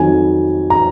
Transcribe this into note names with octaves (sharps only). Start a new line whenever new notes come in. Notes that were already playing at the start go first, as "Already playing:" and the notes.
Already playing: F2 D#3 F#3 G#5
A#5